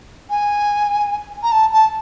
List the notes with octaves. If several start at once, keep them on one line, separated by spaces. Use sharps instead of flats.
G#5
A#5
A5
A5